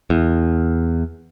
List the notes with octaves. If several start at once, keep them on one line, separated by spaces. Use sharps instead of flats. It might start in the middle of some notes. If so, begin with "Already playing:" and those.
E2